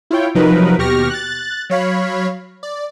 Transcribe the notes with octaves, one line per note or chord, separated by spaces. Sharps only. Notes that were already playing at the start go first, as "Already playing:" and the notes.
E4 F4 C#5 G5
C3 F3 F#3 D#4 A#4 B4
D#2 B2 G4 C#6 F6 A#6
F#6 A6
F#3 C#5 F5 B5
D5